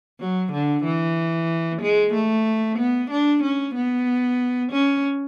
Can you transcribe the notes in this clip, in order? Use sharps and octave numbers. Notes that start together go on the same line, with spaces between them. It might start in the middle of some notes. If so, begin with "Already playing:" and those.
F#3
D3
E3
G#3
A3
B3
D4
C#4
B3
C#4